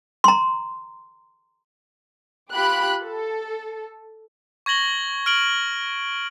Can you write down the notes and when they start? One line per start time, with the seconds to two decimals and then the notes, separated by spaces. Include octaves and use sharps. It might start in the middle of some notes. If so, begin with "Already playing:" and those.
0.24 A#5 C6
2.52 F4 G4 B5 F#6
3.04 A4
4.66 C#6 G#6 A#6 F#7 G7
5.26 F6 D7 F#7